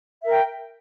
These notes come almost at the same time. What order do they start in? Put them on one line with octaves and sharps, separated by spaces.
E5 A#4 G5